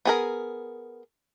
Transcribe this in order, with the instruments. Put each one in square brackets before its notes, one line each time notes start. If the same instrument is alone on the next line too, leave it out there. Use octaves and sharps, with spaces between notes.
[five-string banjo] B3 G#4 A#4